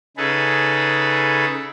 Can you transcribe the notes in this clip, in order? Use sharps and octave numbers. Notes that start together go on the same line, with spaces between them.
C#3 D#4 G#4 A4 B4